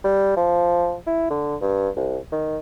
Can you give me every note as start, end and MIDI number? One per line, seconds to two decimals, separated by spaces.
0.04 0.35 55
0.37 0.96 53
1.07 1.30 64
1.30 1.56 50
1.61 1.89 43
1.96 2.18 36
2.32 2.58 51